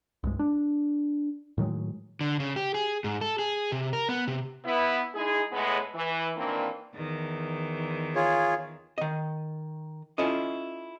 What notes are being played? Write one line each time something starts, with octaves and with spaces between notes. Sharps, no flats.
C2 G2 G#3
D4
A2 D#3 F#3 G#3
D3
C#3
G4
G#4
G#2
A4
G#4
C3
A#4
B3
C3
B3 E4
G#3 D#4 E4 G#4
A2 G#3 B3
E3
A#2 D#3 E3 A#3 C4 D4
E2 D#3
F4 G#4 C#5
D#3 D#5
C#4 E4 F4 A4 D#5